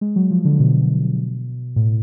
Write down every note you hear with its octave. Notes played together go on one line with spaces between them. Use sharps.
G#3
F#3
F3
D3
B2
A2